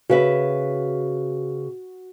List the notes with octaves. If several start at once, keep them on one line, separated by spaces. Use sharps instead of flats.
C#3 F#4 B4 E5